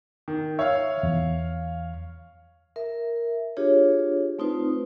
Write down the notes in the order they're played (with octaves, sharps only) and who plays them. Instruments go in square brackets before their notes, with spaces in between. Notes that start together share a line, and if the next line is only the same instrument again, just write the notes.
[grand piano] D#3
[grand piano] C#5 F5 [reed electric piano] E5
[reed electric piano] E2
[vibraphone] A#4 E5
D4 F4 G4 G#4 C#5
A3 C4 D#4 F4 B4 C5